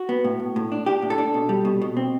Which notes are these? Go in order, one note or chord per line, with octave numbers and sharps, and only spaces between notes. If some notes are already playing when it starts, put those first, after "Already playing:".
Already playing: F#4
B3
A2
A2
A2
D4
D4 G4
A2
A4
D4
B2
G3
B2
B2
C4